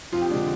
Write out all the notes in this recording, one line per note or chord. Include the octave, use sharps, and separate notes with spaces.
F2 F4
G4
D3 G#3 D4